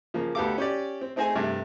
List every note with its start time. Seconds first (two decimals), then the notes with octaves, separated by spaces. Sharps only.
0.14 C#3 F3 A#3
0.35 D2 B3 G4 A4 F5 D6
0.58 C#4 G4 D5
1.01 C4
1.16 A3 C4 D#4 G#4 C5 G#5
1.36 G2 C3 A3